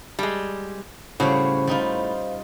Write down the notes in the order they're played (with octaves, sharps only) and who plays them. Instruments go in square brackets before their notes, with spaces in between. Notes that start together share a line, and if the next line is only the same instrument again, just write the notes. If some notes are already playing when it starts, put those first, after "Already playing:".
[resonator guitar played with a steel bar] G3 G#3 [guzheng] A5
[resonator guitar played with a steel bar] A2 F#4 [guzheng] C#3 G3 [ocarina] C5
[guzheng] G3 D#4 F4